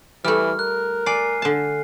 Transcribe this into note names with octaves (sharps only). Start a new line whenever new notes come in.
E3 G3 A3 F6
A#4 F#6
D5 G#5 C7
D3 A5